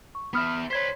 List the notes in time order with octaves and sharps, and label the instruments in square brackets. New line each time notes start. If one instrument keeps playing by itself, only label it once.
[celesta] C#6
[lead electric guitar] B3 E5 [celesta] B5 D#6 F6
[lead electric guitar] C5 B5 [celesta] C#5 G#6 B6